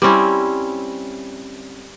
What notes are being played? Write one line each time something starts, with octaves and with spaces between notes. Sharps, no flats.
G3 C4 C#4 E4